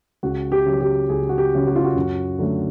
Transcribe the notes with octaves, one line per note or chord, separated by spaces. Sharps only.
C#2 F#4
G4
C#3 F#3
G4
C#2 G#4
F#4
G4
C#3 F#3
F#4
F4
F#4
F#2
D3 F#3 A3